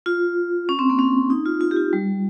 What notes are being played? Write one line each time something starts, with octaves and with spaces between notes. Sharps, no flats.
F4
C#4
C4
A#3
C#4
D#4
F4
F4
G4
F4
G3